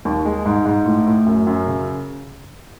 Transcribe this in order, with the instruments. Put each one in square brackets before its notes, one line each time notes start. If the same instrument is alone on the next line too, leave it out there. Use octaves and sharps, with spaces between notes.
[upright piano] D#2
G#3
G#2
G#2
A2
A2
F#2
F#2
C#3